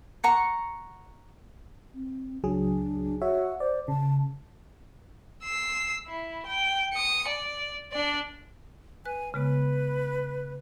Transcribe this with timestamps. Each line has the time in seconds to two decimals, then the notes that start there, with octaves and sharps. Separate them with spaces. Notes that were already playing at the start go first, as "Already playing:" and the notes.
0.24 F#5 A#5 C#6
1.94 C4
2.44 C#2 F#3 D4 G#4
3.22 F#4 C#5 E5 F#5
3.60 C5 D5
3.88 C#3 A5
5.43 E6 C7
6.08 E4
6.46 G5
6.93 D#6 C#7
7.28 D5
7.92 D4 D5
9.05 B4 G#5 F#6
9.34 C#3 G#3 B3 B4